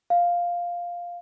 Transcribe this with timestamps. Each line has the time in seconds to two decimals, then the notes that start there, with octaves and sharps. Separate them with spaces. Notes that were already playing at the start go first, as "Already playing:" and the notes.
0.10 F5